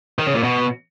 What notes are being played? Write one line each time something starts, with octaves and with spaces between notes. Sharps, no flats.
D#3
C#3
A#2
B2